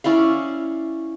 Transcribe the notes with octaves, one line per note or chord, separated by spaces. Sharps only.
C#4 E4 D5 F5